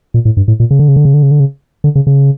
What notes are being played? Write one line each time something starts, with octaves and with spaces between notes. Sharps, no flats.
A#2
A2
G2
A2
A#2
C#3
D3
C#3
D3
C#3
D3
C#3
D3
C#3
D3
C#3
C#3